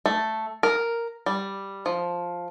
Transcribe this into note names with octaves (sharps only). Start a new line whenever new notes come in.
A3
A#4
G3
F3